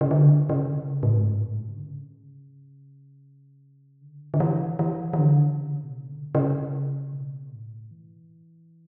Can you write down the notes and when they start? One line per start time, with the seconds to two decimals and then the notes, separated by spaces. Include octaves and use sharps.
0.01 C#3
0.11 D3
0.50 C#3
1.03 A2
1.15 G#2
1.40 A2
1.68 C#3
1.76 D3
1.84 C#3
4.01 D3
4.34 D3
4.40 E3
4.79 E3
5.13 E3
5.18 D3
5.57 C#3
5.83 B2
6.09 D3
6.27 B2
6.35 C#3
7.13 B2
7.52 A2
7.91 E3